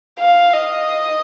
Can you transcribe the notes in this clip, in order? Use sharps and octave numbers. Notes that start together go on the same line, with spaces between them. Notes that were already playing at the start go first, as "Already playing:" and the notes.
F5
D#5